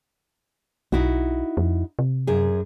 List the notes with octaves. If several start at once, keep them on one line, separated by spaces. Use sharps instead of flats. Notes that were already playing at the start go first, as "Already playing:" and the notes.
B1 D#4 E4 F#4
F2
C3
F#2 G#4